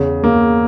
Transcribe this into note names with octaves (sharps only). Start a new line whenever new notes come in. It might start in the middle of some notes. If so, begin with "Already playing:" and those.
Already playing: E2 C#3
A#3